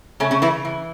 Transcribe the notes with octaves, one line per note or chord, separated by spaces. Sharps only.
C#3 A3 C#4
C#3 C#4
C#3 E3 E4
E3